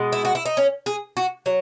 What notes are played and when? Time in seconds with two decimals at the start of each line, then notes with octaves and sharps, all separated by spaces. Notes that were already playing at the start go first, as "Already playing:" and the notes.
Already playing: B2 G#3
0.12 E4
0.25 F#4
0.35 E4
0.45 D#4
0.57 C#4
0.86 G#4
1.17 F#4
1.46 F#3